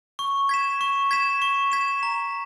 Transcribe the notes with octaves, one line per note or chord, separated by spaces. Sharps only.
C#6
G#6 B6 E7
C#6
G#6 B6 E7
C#6
G#6 B6 E7
A#5